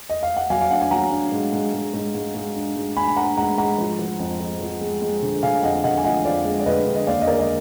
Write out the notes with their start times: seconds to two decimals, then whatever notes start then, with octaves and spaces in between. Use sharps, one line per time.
0.10 D#5
0.23 F5
0.37 F#5
0.50 F#3 F5 G#5
0.61 F5
0.70 D4 F#5
0.81 G#5
0.91 F#3 F#5 A#5
1.11 D4
1.32 G#2
1.53 G#2
1.73 G#2
1.94 G#2
2.15 G#2
2.35 G#2
2.56 D4
2.76 G#2
2.96 D4 G#5 B5
3.17 D4 F#5 A#5
3.37 G#2 F#5 A#5
3.58 G#2 F#5 A#5
3.78 F3
3.99 F3
4.19 F2
4.40 F2
4.61 F3
4.81 G#3
5.02 G#3
5.23 D3
5.43 D3 F5 G#5
5.63 F2 D#5 F#5
5.84 D3 D#5 F#5
5.97 G#5
6.04 F3 D#5 F#5
6.25 F2 D5 F5
6.45 G#3
6.60 D5
6.66 D3 B4 D#5
6.87 D3
6.95 D#5
7.07 D#2 D5 F5
7.22 D#5
7.27 G#3 A#4 D5
7.39 D#5